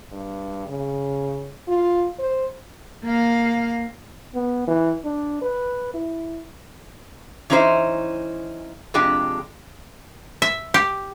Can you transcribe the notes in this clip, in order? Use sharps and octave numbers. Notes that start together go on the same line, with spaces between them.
G2
C#3
F4
C5
A#3 F5
B3
E3
D4
B4
E4
E3 C#4 D#4 E4 C5
F2 C3 G#3 D4 G4
E5
G4